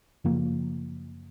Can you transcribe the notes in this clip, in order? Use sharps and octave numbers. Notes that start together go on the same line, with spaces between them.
F#2 C#3 F3 A#3